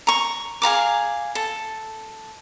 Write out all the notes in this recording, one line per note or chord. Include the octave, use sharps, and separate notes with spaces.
A#5 C#6
G#4 F5 A#5 D6
A4